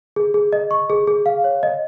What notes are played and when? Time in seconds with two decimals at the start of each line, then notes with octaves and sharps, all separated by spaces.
0.16 G#4
0.34 G#4
0.53 D#5
0.71 C#6
0.90 G#4
1.07 G#4
1.26 F5
1.44 C#5
1.63 D#5